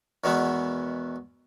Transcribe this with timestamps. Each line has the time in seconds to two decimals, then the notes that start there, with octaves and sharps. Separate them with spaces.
0.24 E2 B2 D#3 E3 G#3 B3